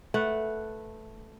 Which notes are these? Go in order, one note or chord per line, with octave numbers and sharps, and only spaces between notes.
A3 B4 F#5